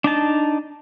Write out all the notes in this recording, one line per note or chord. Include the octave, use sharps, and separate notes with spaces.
D4 D#4 A5